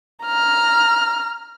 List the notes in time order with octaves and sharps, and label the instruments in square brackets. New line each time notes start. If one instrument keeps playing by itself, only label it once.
[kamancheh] A#5 F6